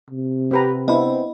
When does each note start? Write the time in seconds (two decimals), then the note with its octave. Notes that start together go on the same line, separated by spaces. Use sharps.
0.10 C3
0.51 C4 G4 B4 A#5
0.88 B3 C4 D4 E4 D#5 B5